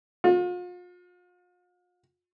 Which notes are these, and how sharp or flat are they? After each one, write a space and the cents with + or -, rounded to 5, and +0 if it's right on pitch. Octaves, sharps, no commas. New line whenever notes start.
F4 +40